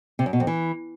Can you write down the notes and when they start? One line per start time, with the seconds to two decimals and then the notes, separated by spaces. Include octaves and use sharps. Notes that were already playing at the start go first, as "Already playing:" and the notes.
0.19 C3
0.26 F#2
0.33 B2
0.40 F2
0.47 E3